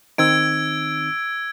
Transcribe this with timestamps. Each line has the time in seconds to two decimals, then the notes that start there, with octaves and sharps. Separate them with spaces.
0.18 D#3 C4 D#4 E6 G#6 D7